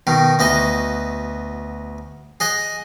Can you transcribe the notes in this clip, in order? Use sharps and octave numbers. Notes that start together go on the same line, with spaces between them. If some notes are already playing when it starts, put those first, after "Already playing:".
B2 D#3
D2 B3 F#4 D#5
G#4 D#5 F#5 G#5